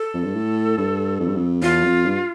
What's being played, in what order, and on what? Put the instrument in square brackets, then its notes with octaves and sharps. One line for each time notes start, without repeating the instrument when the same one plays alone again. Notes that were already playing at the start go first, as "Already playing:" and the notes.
Already playing: [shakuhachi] A4
[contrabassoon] F2
G2
A2
G2
F2
G2
F2
[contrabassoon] E2 [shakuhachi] F4
[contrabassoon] F2
G2